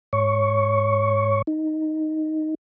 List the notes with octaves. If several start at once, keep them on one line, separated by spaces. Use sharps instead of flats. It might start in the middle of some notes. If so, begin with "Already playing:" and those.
G#2 C#5 C#6
D#4